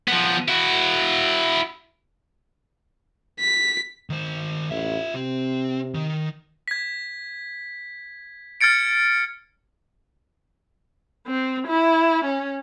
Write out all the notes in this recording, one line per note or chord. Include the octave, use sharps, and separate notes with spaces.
F3 B3
E4 F#4
B6
D#3 C5
A1 F4 E5
C3 C4
D#3
G#6 B6
F6 G#6 A6 C#7 D7
C4
E4
C#4